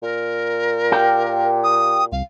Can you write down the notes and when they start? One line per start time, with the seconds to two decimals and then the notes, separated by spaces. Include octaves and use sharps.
0.02 A#2 A#4
0.92 G4 F5 G5
1.64 D#6
2.12 C2 F5